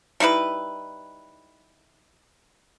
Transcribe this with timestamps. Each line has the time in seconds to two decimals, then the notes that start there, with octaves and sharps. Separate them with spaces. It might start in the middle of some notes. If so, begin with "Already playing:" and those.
0.20 G3 D#4 E4 B4